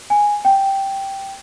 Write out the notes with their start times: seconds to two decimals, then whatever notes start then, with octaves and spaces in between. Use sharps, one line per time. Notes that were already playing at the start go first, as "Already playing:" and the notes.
0.10 G#5
0.45 G5